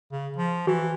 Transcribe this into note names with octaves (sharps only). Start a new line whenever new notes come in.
C#3
F3
E3 F#4